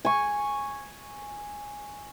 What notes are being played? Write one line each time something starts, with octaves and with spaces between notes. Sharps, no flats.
G#5 C#6